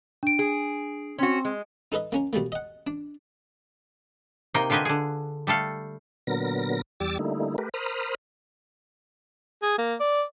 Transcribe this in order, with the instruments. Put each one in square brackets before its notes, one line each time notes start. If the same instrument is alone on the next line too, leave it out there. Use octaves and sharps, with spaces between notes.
[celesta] D4 D7
[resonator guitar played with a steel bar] G#4
[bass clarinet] C4 [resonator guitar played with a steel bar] C#4 F#4
[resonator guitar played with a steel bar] G#3
[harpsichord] D#4 A4 B4 D#5 E5
A#3 C#4 A#4
B2 G3 A3 A#3
D#5 F#5
D4
[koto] C3 A#3 D#4 G5
D3 F4 G4 B4 D#5 G#5
D3 G#4
G3 A3 A4 F5
[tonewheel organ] A#2 D3 F#3 B3 A#4 A#6
E2 G3 G4 D6 E6 A6
D3 G3 A3 A#3 D#4 E4
A3 G4 A#4 B4
A#4 C5 B5 D#6 F6
[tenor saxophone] G#4
A#3
D5